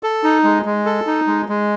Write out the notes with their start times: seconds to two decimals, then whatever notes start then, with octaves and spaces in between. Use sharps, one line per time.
0.03 A4
0.24 D#4
0.44 G#3
0.65 G#3
0.85 A4
1.07 D#4
1.27 G#3
1.49 G#3